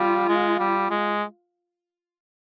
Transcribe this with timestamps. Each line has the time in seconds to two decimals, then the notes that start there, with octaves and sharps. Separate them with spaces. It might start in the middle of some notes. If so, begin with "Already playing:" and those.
Already playing: G3 F4
0.28 G#3
0.59 G3
0.90 G#3